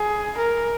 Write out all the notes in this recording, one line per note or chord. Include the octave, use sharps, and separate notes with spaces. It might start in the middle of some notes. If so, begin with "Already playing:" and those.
Already playing: G#4
A#4